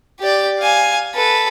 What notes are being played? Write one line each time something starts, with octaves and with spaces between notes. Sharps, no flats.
G4 D5
F5 G#5
A4 B4